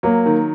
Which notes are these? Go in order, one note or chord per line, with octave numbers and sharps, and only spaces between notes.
F#3 A#3
D#3